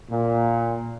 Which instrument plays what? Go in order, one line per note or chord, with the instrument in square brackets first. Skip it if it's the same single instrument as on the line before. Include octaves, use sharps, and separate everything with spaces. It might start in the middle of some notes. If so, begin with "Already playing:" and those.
[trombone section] A#2